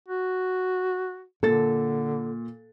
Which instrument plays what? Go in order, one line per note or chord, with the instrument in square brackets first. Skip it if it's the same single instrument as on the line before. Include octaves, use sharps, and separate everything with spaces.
[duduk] F#4
[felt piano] A#2 A6 [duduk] D3 [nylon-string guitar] A4